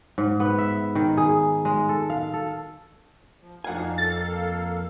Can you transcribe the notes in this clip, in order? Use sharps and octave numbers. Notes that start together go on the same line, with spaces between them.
G#2
B3
E5
D#3
G#4
G#3
A4
F5
A4
F3
F2 D4 D#4 F5 F#5 G#5
A#3 A4 F5 A6